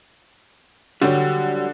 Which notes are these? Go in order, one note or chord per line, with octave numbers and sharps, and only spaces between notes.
D3 F#3 G3